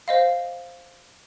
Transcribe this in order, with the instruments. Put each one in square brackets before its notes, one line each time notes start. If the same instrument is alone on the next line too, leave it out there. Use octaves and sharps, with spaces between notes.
[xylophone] C5 D#5 F5